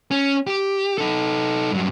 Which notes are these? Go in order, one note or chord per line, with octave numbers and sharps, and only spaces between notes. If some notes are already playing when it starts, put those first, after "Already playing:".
C#4
G4
D#4 A4
G2 F#3